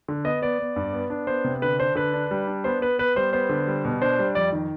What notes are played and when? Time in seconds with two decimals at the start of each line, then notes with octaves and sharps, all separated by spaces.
0.08 D3
0.25 B3 D#5
0.42 B3 D5
0.59 B3
0.76 G2
0.93 B3
1.10 D4
1.27 B3 C5
1.44 C3
1.62 D3 B4
1.79 D4 C5
1.95 D3 B4
2.14 D4
2.31 G3
2.47 D4
2.64 B3 C5
2.81 B3 B4
2.98 B3 B4
3.16 G3 C5
3.33 B3 C5
3.49 D3
3.67 G3
3.85 B2
4.02 D4 C5
4.19 G3
4.35 F2 D5
4.52 D#3